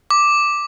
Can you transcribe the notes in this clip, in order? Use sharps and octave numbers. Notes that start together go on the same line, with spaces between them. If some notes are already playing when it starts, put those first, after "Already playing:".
D6